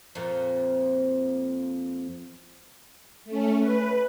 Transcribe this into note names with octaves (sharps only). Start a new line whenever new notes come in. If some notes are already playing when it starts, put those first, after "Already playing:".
F2 A#2 F3
A3 C#4
B4